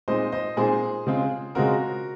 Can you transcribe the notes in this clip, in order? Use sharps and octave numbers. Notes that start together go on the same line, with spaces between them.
A#2 G#3 C4 D#4 C5 D#5
C5 D#5
A#2 G#3 C4 D#4 G#4 C5
C#3 G#3 C4 F4
C#3 G#3 C4 F4 F#4 A#4